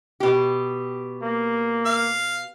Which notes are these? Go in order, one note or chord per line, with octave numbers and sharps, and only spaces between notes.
B2 G4
A#3
F5